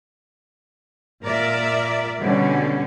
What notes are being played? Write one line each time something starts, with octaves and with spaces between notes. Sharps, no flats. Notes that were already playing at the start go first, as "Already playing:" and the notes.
A#2 A#4 D5 E5
B2 D3 G3 C#4